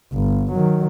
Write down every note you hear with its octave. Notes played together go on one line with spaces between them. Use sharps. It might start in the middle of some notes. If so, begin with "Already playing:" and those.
G1
D#3 F#3